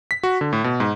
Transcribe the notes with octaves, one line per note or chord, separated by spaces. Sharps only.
B6
F#4
D3
A2
B2
G#2